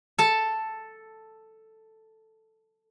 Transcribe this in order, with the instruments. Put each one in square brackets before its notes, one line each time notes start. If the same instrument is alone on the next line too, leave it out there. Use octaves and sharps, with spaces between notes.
[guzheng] A4 A5